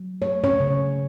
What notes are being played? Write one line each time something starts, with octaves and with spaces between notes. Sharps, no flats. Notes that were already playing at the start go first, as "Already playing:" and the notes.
Already playing: F#3
A3 C#5
C#4 C#5
C#3